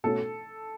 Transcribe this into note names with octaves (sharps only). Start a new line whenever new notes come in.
B2 A3 C#4 F#4 A4